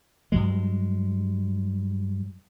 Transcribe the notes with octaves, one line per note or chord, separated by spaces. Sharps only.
G2 F#3 G#3